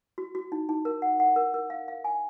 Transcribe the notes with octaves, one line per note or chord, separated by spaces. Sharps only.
F#4
F#4
D#4
D#4
A#4
F#5
F#5
A#4
A#4
F5
F5
G#5